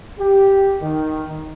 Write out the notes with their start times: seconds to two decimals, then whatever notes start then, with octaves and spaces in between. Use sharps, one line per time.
0.19 G4
0.82 D#3